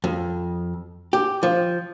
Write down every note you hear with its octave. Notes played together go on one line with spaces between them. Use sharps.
F2
G4
F3